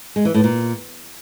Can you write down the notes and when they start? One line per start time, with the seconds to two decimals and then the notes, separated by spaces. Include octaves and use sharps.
0.16 G#3
0.25 E3
0.34 A2
0.44 A#2